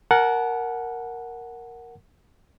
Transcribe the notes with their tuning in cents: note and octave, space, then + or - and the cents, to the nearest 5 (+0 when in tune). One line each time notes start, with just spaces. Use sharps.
A#4 +0 F#5 +0 A5 -35